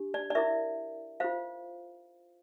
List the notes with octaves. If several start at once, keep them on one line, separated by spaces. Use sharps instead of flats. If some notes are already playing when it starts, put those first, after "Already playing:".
Already playing: D4 G4
D5
D5
E4 A#4 E5
F4 C5 F5